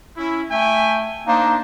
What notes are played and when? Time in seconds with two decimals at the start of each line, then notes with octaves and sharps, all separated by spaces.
0.17 C#4 E4
0.50 A3 E5 G5 G#5
1.27 A#3 D4 D#4 C5